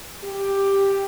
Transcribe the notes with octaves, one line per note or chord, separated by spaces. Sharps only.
G4